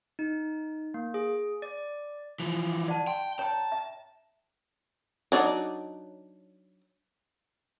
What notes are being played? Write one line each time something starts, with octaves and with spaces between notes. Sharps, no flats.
D#4
A#3
G#4
D5
E3 F3
D5 F#5 A5
G5 C6
C#5 G5 A5 A#5
E5
F#3 D4 D#4